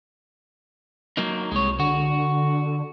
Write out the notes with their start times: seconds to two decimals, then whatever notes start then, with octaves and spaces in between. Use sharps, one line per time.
1.17 F#3 A#3 D#4
1.52 C2 G#3 C#5
1.80 D3 F#4